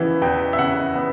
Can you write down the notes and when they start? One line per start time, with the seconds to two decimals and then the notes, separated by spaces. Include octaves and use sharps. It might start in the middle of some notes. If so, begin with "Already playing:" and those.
Already playing: C#3 E3 B3 E5
0.22 E2 G5
0.53 E5
0.58 C#3 F#5
0.95 B3